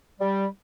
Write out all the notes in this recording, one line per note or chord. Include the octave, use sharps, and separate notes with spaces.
G3